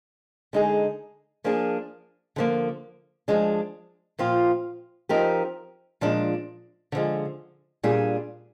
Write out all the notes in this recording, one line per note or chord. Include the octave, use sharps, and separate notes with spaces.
D3 G#3 D#4 G#4
F3 A#3 D4 G#4
D3 F3 A#3
F3 G#3 D4
A#2 F3 C4 F4
F3 C4 D#4 G4 A#4
A#2 F3 G#3 D4
D3 F3 G#3
A#2 G3 D4 F4 G#4